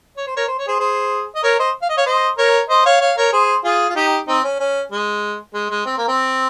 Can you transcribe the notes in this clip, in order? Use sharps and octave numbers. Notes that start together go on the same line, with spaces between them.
C#5
C5
A#4 C#5
C5
C#5
G#4 C5
G#4 C5
D#5
A#4 C#5
C5 D#5
F5
D#5
C#5 F5
C5 D#5
A#4 C#5
C5 D#5
C#5 F5
C#5 F5
A#4 C#5
G#4 C5
F4 G#4
F4
D#4 G4
C4 D#4
C#4
C#4
G#3
G#3
G#3
C4
A#3
C4